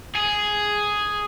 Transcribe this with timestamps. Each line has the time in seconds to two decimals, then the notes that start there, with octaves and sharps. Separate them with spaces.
0.15 G#4